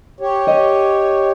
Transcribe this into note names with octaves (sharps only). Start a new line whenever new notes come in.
G4 C#5
D#5